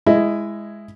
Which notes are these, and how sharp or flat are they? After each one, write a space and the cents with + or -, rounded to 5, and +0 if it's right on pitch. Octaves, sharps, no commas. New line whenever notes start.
G#3 +0 E4 +10 D#5 +0